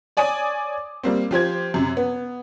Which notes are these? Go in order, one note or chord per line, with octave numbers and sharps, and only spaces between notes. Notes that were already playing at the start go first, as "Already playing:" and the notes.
C#5 D5 G#5 D6 D#6
G3 A#3 C4
F3 G4 C5 G#6
F#2 C3
B3